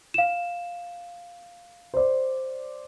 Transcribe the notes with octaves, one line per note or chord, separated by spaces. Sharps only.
F5 E7
C5 D5